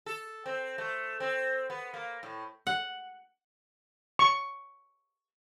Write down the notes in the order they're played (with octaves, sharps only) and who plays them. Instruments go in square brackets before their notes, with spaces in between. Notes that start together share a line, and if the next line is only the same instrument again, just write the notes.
[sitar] A4
C4
A3
C4
B3
A#3
A2
[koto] F#5
[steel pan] C#6